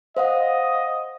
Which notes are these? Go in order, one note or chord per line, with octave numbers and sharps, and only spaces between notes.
C5 D#5 F5 F#5